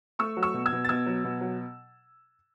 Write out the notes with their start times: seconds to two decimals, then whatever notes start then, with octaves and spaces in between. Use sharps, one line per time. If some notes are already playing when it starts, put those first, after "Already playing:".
0.19 A3 C#6 E6
0.37 F#3
0.43 C#6 E6
0.54 B2
0.66 E6 G#6
0.72 B2
0.85 A6
0.89 B2 E6 G#6
1.06 F#3
1.24 B2
1.41 F#3